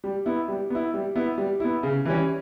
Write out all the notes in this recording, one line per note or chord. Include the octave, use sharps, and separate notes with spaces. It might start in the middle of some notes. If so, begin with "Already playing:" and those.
G3
B3 E4
G3
B3 E4
G3
B3 E4
G3
B3 E4
C#3
E3 G3 C#4